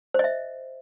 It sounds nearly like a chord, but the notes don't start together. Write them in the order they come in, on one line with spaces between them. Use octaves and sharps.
C5 D#5 E5